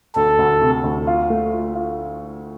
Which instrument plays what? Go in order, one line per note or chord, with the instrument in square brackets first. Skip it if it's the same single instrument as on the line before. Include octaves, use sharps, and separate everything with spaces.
[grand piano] D2 [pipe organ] A4
[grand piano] D2
C3
D2
F4
A3
F4
F4